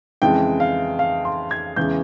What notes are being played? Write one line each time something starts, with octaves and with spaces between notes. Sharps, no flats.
F2 C#3 E3 G#3 G5
F5
F5
C6
G#6
E2 C#3 E3 G#3 G6